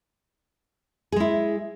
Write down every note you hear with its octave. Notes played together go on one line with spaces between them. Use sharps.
G#3 E4 G#4